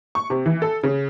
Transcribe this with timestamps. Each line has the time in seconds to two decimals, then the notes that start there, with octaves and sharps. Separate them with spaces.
0.15 C#6
0.30 C3
0.46 E3
0.62 A4
0.83 C#3